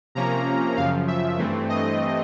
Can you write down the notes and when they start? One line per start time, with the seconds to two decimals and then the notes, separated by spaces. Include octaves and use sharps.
0.15 C3 F3 A#3 C#4 A#5
0.77 F#2 C#3 F3 F5
1.08 E5
1.38 G2 E3 A3 C4
1.69 D#5